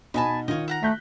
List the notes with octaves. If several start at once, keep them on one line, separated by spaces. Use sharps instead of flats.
B2 D#4 B4 F#5 G#5 A5
D#3 F4 C#5 D#5
E5 F#5 A#5
A3 F#6 G6 B6